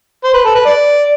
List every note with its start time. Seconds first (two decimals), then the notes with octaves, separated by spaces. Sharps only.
0.24 C5
0.33 B4
0.45 A4
0.55 B4
0.66 D5